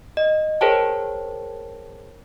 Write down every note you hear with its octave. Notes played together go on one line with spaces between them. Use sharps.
D#5
G#4 A#4 C5 C#5 G5 A5